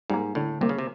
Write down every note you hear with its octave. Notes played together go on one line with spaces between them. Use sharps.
G#2 G3 A#3
A2 D3
C3 G3 A#3
C#3
C3